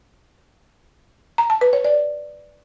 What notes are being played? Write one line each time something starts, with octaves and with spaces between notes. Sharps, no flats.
A#5
A5
B4
C#5
D5